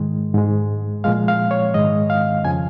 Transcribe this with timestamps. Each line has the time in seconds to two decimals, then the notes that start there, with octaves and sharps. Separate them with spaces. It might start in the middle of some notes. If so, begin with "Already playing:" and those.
Already playing: G#2 D#3 G#3
0.34 G#2 G#3
1.04 A#2 F3 G#3 F5
1.28 F5
1.51 C#5
1.74 G#2 D#3 G#3 D#5
2.10 F5
2.44 F2 C#3 F3 G#5